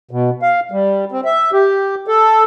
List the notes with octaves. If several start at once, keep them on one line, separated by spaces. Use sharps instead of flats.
B2
F5
G3
C4
E5
G4
A4